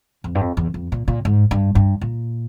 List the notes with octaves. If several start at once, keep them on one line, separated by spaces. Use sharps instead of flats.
F2
G2
F2
E2
F2
A#2
A#2
G#2
G2
G2
A#2